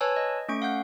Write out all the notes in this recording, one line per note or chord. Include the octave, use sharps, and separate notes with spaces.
B4 C#5 G#5 A5 E6
D#5
A3 C#4 C#6 D7
F5 F#5 G6